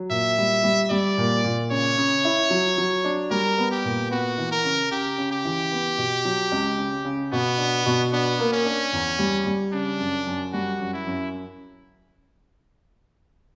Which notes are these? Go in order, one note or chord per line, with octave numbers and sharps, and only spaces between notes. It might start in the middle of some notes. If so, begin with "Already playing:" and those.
Already playing: F#3
A#2 E5
G3
G3
G3 D5
A#2
A#2
C#3 C#5
C#3
E4
F#3
F#3
D4
G3 A#4
B3
G4
A#2
B3 F#4
E3
A#4
C#3
C#3 G4
C#3
G4
E3
B3
B2
F#3
C#2
C#3
C#3
B2 B3
D4
B2
B3 D4
A#3
C#4
D4
E2
G3
G3
C#3 D4
F#2
F#2
G3 F#4
F#2
E4
F#2